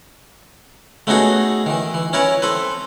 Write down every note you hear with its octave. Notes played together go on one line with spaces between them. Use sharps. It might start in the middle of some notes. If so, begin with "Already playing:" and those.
A3 B3 C#4 D#4 F#4 G#4
D#3 E3
E3
C#4 E4 A#4 B4 C#5
C4 A4 B4